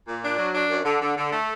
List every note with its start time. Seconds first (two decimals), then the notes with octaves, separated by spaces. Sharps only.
0.08 A#2
0.24 D4
0.39 F#3
0.54 D4
0.70 F#2
0.85 D3
1.02 D3
1.17 D3
1.33 A3